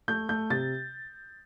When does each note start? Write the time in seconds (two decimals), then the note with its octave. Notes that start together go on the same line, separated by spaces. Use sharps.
0.08 A3 G6
0.29 A3 G6
0.50 C3 A6